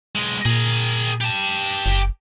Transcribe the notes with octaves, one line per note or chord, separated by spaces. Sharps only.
B1 G#3
A#2 G#4 A#4
G4 A5
F#1